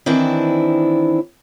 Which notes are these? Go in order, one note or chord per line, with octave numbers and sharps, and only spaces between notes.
D#3 E3 C4 D4 E4